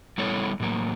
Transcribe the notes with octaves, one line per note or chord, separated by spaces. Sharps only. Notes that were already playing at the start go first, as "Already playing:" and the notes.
G3 B3 E4 A4 C#5
A2 F#3 A#3